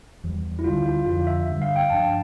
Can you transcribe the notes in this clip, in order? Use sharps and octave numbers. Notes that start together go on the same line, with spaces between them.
E2 E3 G3
E4
D2 D3 G3 F4
F4
F2 D3 F3 F4
E5
G2 D3 G3
F5
G5
G2 F3 A#3 D4 A5